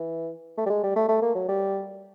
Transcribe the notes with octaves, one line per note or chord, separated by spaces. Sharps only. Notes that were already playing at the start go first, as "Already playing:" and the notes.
Already playing: E3
A3
G3
G#3
G3
A3
A3
A#3
F#3
G3